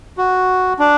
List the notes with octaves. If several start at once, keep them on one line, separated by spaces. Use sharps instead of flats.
F#4
D4